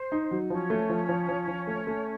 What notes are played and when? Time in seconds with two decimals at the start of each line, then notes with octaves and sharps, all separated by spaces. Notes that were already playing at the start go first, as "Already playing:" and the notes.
Already playing: C5
0.12 D#4
0.31 F#3
0.50 F3 C#4 C#5
0.70 A3
0.89 F3
1.09 F3
1.29 F3
1.48 F3
1.67 A3
1.87 A3